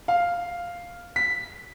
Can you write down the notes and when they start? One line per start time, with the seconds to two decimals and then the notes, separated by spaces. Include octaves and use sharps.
0.08 F5
1.16 B6